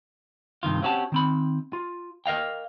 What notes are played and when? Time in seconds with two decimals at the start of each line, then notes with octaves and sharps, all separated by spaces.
0.63 G2 C3 D#3 F4
0.82 C4 C#4 F#4 G4 A5
1.12 D#3 C4 B5
1.73 F4
2.26 A#4 D#5 F5 G5